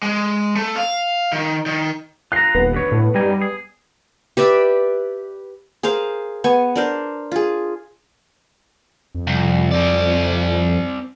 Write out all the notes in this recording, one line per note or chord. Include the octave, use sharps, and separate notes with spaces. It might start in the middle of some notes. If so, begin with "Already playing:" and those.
G#3
A3
F5
D#3
D#3
F4 A#5 F#6 C7
D#1 B3
D2 C#5
A2
F#2 G3 D#4 G#5
G#4
G4 B4 D5 E5
G#4 A#4 C5 F5
B3 G#5 C#6
D4 A#4 C5
F4 G#4
F2
C2
C4 D5